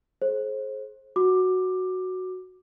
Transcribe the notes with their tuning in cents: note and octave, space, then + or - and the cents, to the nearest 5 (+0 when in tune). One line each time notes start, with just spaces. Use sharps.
G#4 +40 C5 +30
F#4 +0 D6 +10